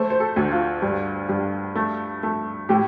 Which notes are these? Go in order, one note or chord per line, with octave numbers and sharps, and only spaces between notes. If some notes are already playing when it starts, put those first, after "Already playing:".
Already playing: A3 C5
C5
A4
D2
F4
G2
G2
A3
A3
A2 G4